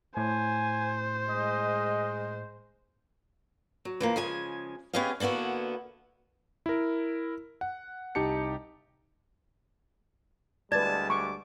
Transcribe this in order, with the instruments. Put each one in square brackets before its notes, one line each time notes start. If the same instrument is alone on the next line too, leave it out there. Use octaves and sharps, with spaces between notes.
[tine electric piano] A2 [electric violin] C5 [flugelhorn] G#5
[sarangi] G#3 [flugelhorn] D#5
[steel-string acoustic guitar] F#3
E3 F3 A#3
C#3 F3 G#3 G#5
B3 C#4 G4 G#4 D#5 F5
D3 A#3 B3 E4 F#4
[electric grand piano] E4 A#4
F#5
C2 D#4 G4 A5 C#7
[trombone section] D2 G3 G#3 [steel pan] B4 D5 [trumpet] A5 [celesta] G#6 A6
[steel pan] C#6 [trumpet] D6